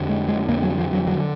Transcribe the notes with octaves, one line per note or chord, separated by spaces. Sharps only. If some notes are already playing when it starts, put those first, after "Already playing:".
Already playing: F2 D3
G#3
G#3
F2 D3 A#3
F#3
F3
F#3
D3 F#3